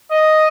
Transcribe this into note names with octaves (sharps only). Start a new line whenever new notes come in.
D#5